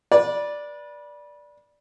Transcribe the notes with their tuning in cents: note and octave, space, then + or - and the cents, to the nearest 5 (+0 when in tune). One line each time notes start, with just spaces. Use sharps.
B4 -30 D5 +0